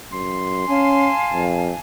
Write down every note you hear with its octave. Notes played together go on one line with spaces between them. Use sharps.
F#2 C6
C#4 F5 G#5 A5
F2